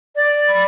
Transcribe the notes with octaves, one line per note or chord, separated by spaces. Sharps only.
D5
B5